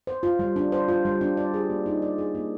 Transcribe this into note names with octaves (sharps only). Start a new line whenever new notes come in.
C5
F4
G3
D4
C5
F4
G3
D4
D5
G#4
A#3
D#4
D5
G#4
A#3